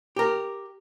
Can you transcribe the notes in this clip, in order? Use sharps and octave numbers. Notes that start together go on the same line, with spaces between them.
G4 A#4